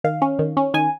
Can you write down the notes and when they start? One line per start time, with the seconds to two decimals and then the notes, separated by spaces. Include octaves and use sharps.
0.04 D#3 F5
0.22 C#4
0.39 D#3
0.57 C#4
0.74 D#3 G#5